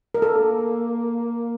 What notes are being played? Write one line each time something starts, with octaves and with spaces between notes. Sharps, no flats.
A#4
A#3 A4